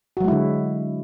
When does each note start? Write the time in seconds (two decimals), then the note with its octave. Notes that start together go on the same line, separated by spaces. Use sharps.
0.17 F#4
0.20 F#3
0.24 G#3
0.28 E4
0.32 D3